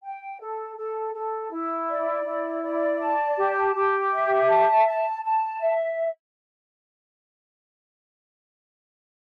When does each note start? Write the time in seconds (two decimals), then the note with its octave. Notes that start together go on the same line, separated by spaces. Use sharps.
0.02 G5
0.39 A4
0.76 A4
1.14 A4
1.51 E4
1.88 D5
2.25 E4
2.63 D5
3.01 A5
3.37 G4
3.75 G4
4.12 E5
4.49 A5
4.86 A5
5.23 A5
5.60 E5